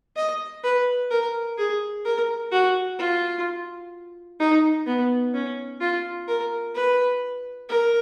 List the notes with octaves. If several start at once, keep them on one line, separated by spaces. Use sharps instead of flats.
D#5
B4
A#4
G#4
A#4
F#4
F4
D#4
B3
C#4
F4
A#4
B4
A#4